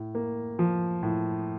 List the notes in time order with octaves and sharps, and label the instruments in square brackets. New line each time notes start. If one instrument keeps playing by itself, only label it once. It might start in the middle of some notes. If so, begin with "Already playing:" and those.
Already playing: [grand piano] A2
A#3
F3
A2